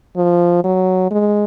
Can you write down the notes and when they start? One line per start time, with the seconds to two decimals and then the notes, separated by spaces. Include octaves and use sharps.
0.17 F3
0.64 F#3
1.11 G#3